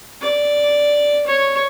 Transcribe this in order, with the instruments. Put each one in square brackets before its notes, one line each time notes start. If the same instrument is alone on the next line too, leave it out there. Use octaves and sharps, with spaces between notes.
[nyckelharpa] D5
C#5